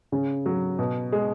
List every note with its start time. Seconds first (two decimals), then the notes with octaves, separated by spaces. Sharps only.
0.12 C#3 C#4
0.46 F#3
0.79 B2
1.12 G#3